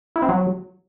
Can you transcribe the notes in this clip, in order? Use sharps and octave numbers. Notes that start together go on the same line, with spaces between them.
E4
C4
F#3